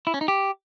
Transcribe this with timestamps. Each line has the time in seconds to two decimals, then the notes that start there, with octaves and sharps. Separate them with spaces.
0.07 E4
0.14 C#4
0.21 D#4
0.28 G4